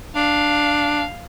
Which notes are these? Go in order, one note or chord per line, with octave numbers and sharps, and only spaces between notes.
D4 F5